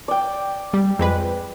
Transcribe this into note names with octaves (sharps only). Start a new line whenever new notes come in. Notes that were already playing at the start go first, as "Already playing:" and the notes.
D5 G5
G3
F2 G#3 B4